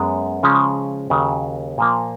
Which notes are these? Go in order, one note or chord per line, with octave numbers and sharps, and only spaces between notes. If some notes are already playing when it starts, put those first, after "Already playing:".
Already playing: F#2 G#3 B3
C#3 F3 G#3 C#4
D#2 C#3 F#3
A#2 F3 A#3